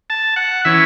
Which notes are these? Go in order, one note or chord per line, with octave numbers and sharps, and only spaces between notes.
A5
F#5
E3 C#4 E5